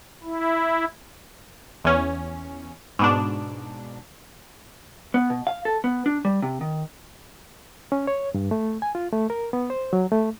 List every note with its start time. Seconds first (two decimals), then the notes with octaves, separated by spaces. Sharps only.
0.24 E4
1.85 E2 C#4
2.99 G#2 B2 D4
5.14 B3
5.30 B2
5.47 F5
5.65 A4
5.84 B3
6.06 D4
6.25 G3
6.42 C3
6.61 D#3
7.92 C#4
8.07 C#5
8.34 G2
8.51 A3
8.82 G#5
8.95 F4
9.13 A3
9.30 A#4
9.53 B3
9.70 C5
9.93 F#3
10.12 A3